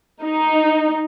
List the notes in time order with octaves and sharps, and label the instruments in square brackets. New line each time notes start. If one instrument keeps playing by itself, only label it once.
[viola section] D#4